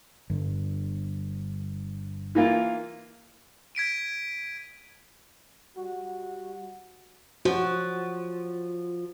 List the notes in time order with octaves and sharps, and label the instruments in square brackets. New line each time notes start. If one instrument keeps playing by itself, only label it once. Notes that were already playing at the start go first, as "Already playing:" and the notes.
[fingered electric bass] G1 G2
[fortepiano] E3 A#3 F4
[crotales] G#6 B6 D7 D#7
[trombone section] G3 F#4
[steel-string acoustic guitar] F3 [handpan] F#4